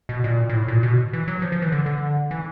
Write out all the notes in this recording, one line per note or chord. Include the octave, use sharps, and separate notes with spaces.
B2
A#2
A#2
A2
A#2
B2
E3
F#3
F3
F3
E3
D3
D3
E3